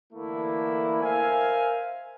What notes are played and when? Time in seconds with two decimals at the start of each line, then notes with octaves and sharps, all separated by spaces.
0.13 D3 E3 A3 A#3 E4
1.02 A#4 C5 E5 F5 G#5